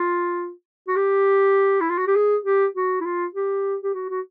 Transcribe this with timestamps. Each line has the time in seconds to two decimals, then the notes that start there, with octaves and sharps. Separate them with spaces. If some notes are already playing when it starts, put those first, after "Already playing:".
Already playing: F4
0.88 F#4
0.96 G4
1.81 E4
1.90 F4
1.98 F#4
2.07 G4
2.16 G#4
2.45 G4
2.75 F#4
3.01 E4
3.05 F4
3.34 G4
3.83 G4
3.94 F#4
4.10 F#4